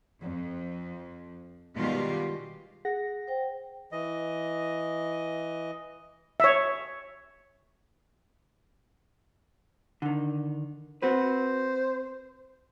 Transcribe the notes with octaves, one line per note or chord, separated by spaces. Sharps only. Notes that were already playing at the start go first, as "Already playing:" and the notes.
F2
B2 D#3 G3 G#3 F4 G4
G#4 F#5 A#6
C5 G5
E3 D#5
C#5 E5
D3 D#3
C4 F#4 B4 C5